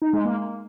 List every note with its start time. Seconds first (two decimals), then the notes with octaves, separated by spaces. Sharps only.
0.02 D#4
0.13 G#3
0.25 A#3